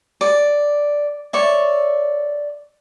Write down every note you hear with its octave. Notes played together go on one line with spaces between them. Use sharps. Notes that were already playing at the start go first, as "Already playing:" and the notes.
D5
C#5 D5 E5